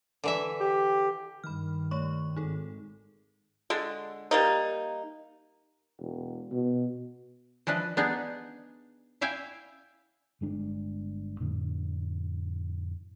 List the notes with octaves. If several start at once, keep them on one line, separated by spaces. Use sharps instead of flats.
D3 E3 E5
G4
G2 D#3 B5 F6
A3 C#5 C#6
G#1 D#4 G#4 A4
D3 G#3
G3 A#3 D#4
E1
B2
E3 F3 D4 B4 D#5
B3 D4 D#4 G#4
E4 E5 F5 G5 G#5
G1 G#3 D4
F2 A2 D3